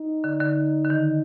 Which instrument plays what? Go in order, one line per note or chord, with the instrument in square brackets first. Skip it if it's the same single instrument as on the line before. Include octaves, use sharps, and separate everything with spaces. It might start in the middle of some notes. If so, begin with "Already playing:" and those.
Already playing: [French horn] D#4
[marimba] D3
D3
D3
D#3